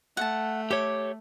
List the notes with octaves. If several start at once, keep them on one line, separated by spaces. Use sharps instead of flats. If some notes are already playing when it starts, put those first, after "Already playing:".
A3 F#5 A5
G4 A4 C#5 D6